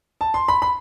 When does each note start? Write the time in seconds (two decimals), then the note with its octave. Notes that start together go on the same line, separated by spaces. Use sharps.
0.21 A5
0.34 C6
0.48 B5
0.62 B5